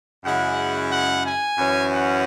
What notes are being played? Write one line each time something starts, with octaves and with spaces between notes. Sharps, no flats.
F#2 C#3 G#3 E4 F#5
F#5
G#5
F#2 E3 C#4
F#5